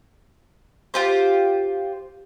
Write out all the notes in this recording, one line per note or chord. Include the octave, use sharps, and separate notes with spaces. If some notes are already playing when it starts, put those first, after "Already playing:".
F4 G4 C5